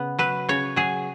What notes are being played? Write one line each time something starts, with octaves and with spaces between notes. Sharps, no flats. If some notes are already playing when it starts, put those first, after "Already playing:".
Already playing: C#3 B3
F#3 B4
C#3 C#5
F#3 G#4